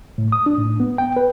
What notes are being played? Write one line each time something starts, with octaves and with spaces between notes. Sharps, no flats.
A2
D#6
D4
A2
B3
G5
B4